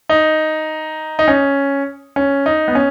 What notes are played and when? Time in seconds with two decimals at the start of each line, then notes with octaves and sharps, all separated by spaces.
0.09 D#4
1.19 D#4
1.28 C#4
2.16 C#4
2.46 D#4
2.68 B3
2.75 C#4